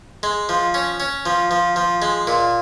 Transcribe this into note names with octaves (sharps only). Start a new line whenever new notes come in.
G#3
F3
C#4
C#4
F3
F3
F3
G#3
A#2